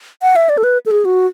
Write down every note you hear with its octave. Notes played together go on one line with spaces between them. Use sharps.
F#5
E5
D5
A4
B4
A4
G#4
F#4